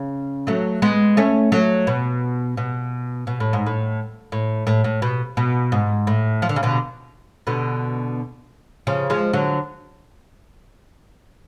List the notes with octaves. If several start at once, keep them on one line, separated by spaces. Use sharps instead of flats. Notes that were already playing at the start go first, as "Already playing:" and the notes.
Already playing: C#3
F#3 A3
G#3 B3
A3 C#4
F#3 A3
B2
B2
B2
A2
G#2
A2
A2
A2
A2
B2
B2
G#2
A2
F3
D3
C#3
B2 D3
B2 D3
C#3 F3
F3 G#3
D3 F#3